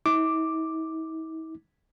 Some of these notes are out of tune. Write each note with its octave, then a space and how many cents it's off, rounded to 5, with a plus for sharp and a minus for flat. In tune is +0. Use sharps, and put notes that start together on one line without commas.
E4 -45 D6 +0